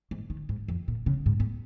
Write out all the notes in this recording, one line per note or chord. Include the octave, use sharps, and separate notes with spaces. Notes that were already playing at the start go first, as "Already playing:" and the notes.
G#2
D#3
G#2
F2
A#2
C#3
G#2
G#2